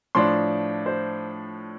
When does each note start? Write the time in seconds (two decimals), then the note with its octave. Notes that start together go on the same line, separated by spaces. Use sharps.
0.15 A2 F3 D4 C6
0.86 C5